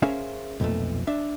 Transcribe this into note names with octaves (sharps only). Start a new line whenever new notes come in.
C#4 G#4 A#4 C5 E5 F5
B1 F2 A#2 A3
D4 E5